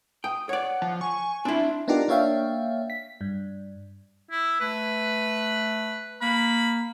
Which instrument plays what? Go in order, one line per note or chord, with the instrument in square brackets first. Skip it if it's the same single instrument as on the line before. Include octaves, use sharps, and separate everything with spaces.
[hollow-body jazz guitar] G5 [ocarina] D#6
[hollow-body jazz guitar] C#5 D5 [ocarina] F#5
[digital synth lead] F3
[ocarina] G#5 [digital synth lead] C#6
[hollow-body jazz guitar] C4 E4 [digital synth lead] D4
[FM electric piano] B3 D4 D#4 F4 G4 A#4
A#3 D4 C#5 E5 F5 G5
B6
G2
[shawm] E4
[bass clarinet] A3 [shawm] B4
[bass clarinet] A#3 [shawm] B5